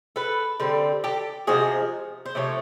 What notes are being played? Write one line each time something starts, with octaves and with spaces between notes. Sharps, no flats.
A4 B4
D3 G3 C4
G4 A4
C3 F3 G#3 F#4 G#4
C5
C3 F3 A3 C#5